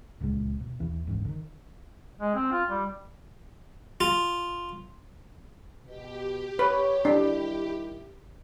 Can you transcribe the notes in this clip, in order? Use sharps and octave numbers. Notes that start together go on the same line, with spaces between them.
D1 C#2 A#2 G#3
B2
D#2 E3 B3
F#1 D2 G#2 E3
D3 D#3
G#3
C4
F4
G3
F4
B2 G4
B4 C#5
D#3 G3 D4 E4